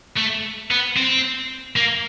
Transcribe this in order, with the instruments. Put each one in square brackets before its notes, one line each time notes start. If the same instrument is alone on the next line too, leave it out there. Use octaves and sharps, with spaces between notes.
[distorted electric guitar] A3
B3
C4
A#3